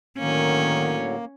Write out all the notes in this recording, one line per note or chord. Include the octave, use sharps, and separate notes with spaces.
A2 D3 D#3 F#3 A#3 C#4